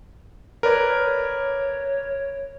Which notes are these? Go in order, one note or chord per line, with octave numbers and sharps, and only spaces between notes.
A#4 B4 C#5 D5